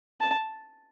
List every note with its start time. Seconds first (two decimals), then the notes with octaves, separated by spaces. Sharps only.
0.21 A5